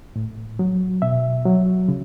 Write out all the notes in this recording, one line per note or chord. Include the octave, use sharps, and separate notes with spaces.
A2
F#3
B2 E5
F#3
C#3